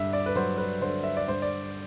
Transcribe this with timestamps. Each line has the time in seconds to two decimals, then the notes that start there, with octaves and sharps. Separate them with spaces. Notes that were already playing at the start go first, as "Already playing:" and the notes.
Already playing: G2 D3 E5
0.13 D5
0.26 B4
0.36 F#3 C5
0.58 B4
0.81 D3 C5
1.04 E5
1.17 D5
1.28 G2 C5
1.42 D5